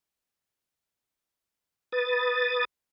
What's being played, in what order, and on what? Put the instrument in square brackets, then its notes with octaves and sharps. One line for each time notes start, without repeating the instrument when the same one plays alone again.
[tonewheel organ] B4 D#6 A6